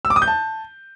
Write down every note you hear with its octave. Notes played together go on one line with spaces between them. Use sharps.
E6
D6
D#6
G6
A5